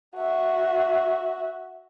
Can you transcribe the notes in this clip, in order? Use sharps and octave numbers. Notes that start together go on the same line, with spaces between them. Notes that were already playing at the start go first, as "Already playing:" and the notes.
F#4 E5